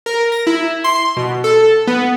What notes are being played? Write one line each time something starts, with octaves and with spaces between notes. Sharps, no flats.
A#4
A#6
E4
C6
B2
A4
B3